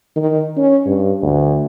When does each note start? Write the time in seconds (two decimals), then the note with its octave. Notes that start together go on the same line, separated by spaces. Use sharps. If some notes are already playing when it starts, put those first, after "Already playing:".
0.16 D#3
0.57 C#4
0.86 G2
1.22 D2